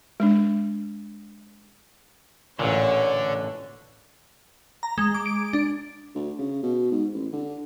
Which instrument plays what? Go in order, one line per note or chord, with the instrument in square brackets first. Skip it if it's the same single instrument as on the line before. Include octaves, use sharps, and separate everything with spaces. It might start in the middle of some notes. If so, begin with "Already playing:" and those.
[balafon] G#3 D4
[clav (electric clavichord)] A1 A#2 [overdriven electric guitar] D3 [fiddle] C#5
[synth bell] A#5
G#3
D6
D7
D4
[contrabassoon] D2
C#3
B2
G#2
A1
D3